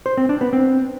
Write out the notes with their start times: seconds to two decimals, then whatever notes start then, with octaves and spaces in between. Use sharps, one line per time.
0.06 C5
0.17 C4
0.29 D4
0.41 B3
0.53 C4